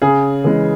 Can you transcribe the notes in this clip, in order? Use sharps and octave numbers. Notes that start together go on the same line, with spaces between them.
C#3 G#4
E3 G#3